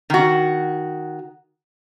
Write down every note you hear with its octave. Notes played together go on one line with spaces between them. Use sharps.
D#3 F#4